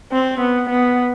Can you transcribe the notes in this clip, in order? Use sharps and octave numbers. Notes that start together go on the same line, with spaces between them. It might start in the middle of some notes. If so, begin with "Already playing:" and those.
C4
B3
B3